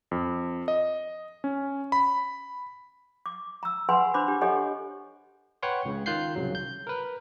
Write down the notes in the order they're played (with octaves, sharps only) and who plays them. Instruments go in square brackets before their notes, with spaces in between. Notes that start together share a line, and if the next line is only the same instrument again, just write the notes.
[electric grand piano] F2
D#5
C#4
B5
[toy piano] D6
A#5 E6
G#4 B4 F#5 G#5 B5 C6
D4 C5 B5 D6
D4 G4
G4 A4 C#5 D#5 F#5 G#5
[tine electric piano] B4 C#5 F#5 G5 C6
C#2 C#3
D#3 F4 F#6 G6 C7
C2 C#3 F#3
G6
A#4 B4